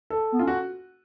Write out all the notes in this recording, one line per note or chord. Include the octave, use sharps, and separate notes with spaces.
A4
B3
C#4 F4
F#4